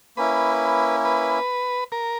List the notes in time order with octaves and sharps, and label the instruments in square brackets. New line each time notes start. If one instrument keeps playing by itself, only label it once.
[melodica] A#3 C#4 E4 [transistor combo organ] B4
[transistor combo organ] B4
A#4